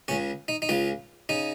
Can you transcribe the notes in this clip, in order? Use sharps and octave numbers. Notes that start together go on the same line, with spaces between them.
C#2 C#3 C#4
D#4
D#4
C#2 C#3 F4
C#3 D#4